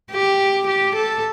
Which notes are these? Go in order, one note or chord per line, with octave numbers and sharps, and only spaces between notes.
G4
G4
A4